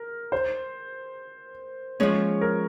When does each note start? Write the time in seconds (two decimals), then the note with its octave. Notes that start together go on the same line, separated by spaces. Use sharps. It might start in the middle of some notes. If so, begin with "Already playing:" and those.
Already playing: A#4
0.32 C5
2.00 F3 G#3 C#4 C#5
2.41 A#4